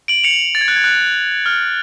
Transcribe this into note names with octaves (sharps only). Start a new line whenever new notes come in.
D7 F#7
C#7 F7
A6
G#6
F#6
G#6
F#6
F6